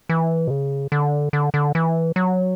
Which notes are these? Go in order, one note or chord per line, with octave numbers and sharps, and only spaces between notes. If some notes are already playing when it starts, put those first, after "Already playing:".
E3
B2
C#3
D3
D3
D3
E3
F#3